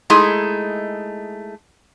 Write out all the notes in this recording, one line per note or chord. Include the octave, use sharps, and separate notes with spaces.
G#3 A3 D#4 E4 G#4